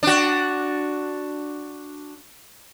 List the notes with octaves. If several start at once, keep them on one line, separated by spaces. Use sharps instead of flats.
D4 F#4